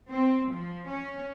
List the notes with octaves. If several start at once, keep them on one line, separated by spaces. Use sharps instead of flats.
C4
F3
C#4